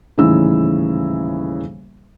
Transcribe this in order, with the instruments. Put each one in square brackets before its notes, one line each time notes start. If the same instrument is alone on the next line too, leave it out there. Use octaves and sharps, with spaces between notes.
[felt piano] D#1 A2 C#3 E3 D#4 E6